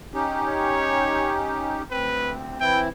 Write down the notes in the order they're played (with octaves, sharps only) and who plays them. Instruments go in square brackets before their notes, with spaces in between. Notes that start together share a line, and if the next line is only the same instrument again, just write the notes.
[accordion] C#4 D#4 G4
[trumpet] C#5
[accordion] D2 C4 [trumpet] B4
[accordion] E3 C4 E4 [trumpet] G5